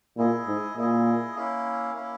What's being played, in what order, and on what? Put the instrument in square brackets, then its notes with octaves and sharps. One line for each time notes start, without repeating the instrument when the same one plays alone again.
[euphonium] A#2 [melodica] E4 G#4 D#5
[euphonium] G#2
[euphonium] A#2 [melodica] E4 G#4 D#5
[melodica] A#3 C#4 E4
A#3 C#4 E4